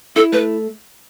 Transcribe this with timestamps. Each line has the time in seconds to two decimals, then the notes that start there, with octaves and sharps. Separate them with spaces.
0.16 E4 A4
0.32 A3 B4